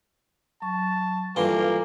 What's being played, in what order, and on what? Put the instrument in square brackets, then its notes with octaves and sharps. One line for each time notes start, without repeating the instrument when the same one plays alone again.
[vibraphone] F#3 C#6 [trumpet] A5
[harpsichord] G2 E3 C6 [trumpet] A#3 [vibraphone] F4 A4 D6